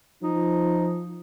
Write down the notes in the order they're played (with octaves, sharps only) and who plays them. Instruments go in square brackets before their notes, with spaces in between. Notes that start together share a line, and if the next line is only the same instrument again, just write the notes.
[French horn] F3 [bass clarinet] D#4